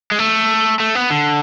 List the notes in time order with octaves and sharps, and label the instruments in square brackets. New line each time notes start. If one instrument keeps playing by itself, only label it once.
[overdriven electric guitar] G#3
A3
A3
B3
D3